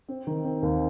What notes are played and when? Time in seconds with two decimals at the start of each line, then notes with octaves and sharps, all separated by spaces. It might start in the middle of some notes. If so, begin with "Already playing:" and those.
0.09 C4
0.27 D#3
0.44 C4
0.63 D#2